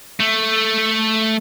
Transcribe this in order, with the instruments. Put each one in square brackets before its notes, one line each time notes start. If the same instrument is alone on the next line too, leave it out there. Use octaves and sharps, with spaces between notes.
[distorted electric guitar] A3